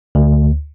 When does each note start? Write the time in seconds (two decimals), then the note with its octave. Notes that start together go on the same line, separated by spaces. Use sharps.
0.15 D2